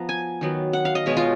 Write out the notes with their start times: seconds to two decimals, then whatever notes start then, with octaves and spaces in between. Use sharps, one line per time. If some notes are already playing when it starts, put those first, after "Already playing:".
Already playing: F3 B3 A#5
0.09 G#5
0.41 D#3 F#3 B3
0.73 F#5
0.85 F5
0.95 D#5
1.06 B2 G#3 B3 C#5
1.17 F4